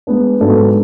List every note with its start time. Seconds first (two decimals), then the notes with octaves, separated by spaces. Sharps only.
0.07 G#3 B3 D4
0.41 G#2 F#3 B3 D4 A4